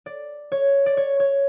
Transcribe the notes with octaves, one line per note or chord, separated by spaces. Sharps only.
D5
C#5
D5
C#5
C#5